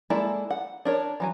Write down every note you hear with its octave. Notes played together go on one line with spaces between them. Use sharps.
G#3 A#3 E4 A4 D5
F#5
D4 A#4 C#5
E3 F#3 G#5